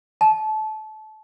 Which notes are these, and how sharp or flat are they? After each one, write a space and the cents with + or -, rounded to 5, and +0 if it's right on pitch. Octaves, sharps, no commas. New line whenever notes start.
A5 -25